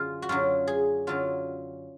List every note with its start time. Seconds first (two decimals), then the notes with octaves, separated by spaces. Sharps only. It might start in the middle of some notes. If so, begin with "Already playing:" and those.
Already playing: F#2 D3 F4 G#4
0.22 F#4
0.29 F#2 D3 F#3 F4
0.67 G#4
1.07 F#2 D3 F#3 F4